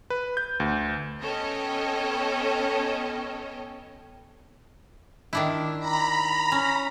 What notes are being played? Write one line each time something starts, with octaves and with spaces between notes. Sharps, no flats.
B4
G6
D2
B3 C#4 A4 C#5 D#5 G5
D#3 D4 E4
A#5 B5
C#4